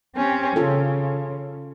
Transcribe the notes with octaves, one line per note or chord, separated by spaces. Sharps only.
C4 C#4 G4
C#3 C#4 F4 A4